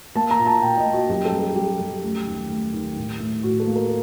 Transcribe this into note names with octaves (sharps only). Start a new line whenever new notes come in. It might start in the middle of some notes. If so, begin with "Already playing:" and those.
A#3 A5
A#5
A#2
A5
A#2 G5
D#5
A#3
F#4
F#2 G4
A4
G3
A4
G3 G4
F#2
A3
D#2
A3
D#2
A2
A2
A2 F#4
A4
A#3
A#4